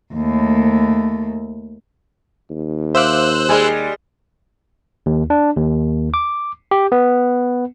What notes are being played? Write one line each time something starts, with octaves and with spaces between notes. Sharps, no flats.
D#2 A3
D#2
C5 E5 F5 D6 E6 F#6
G3 G#3 G#4 G#5
D#2
D4
D#2
D6
G4
B3